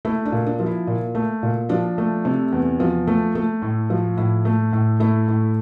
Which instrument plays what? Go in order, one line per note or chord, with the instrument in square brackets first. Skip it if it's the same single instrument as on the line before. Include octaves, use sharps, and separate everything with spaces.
[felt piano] A3 E4
D4
A#2
D4
F3
E4
A#2
A3
A#2
F3 D4
A3
C3
E2
F3
A3
A3
A2
F3
A2 E4
A3
A2
A3 E4
A2